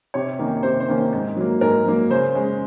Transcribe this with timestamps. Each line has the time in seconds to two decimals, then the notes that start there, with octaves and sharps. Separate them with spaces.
0.14 C3 C#5
0.39 D#3 A#3 C#4
0.63 C3 C5
0.80 C5
0.88 D#3 A#3 C#4
1.13 G#2
1.36 F#3 A#3
1.61 G#2 A#4
1.85 F#3 A#3
2.10 C#3 C5
2.35 G#3 C#4